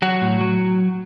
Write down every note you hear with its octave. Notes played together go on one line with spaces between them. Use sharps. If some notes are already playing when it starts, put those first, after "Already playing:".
F#3 F#4
A2
F#3